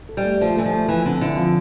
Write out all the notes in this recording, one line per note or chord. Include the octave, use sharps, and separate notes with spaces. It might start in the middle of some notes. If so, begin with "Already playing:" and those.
A4
G3
A3
F3 A3
E3 A3
F3
A3
E3 F3
D3 C4
D3 E4
F3